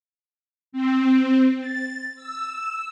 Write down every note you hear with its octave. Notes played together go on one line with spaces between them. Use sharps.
C4
A6
E6